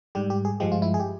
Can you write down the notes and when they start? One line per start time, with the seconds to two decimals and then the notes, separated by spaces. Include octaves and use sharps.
0.15 G#2 G3 G4
0.30 G4
0.45 G#4
0.60 G2 F3 G#3 G4
0.72 F4
0.82 E4
0.94 G#4
1.00 G4